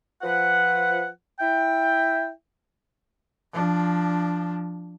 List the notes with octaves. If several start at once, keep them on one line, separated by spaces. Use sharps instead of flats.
F3 B4 F#5
E4 E5 G5
F3 D4